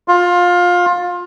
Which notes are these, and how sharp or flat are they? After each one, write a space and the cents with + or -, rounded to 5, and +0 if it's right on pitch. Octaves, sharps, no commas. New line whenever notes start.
F4 +20